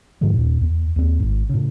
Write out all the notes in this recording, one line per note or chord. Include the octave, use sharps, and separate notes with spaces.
G#2 D3 F3 G#3
D#2 A#2
E2
D#2 C4
G#1 G#2
A2 C#3